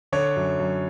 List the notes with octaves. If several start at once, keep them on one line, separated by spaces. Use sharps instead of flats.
D3 C#5
F#2
F#2